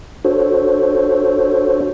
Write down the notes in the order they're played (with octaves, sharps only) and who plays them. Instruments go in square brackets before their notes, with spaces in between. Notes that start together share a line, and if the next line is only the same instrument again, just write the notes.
[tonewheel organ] D4 F#4 A4 C5 C#5